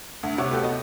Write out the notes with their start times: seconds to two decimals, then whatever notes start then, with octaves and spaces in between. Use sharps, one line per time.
0.23 D2
0.38 C3 C#5 F#5
0.50 A3 B3 F#4 G4 A4
0.64 D#5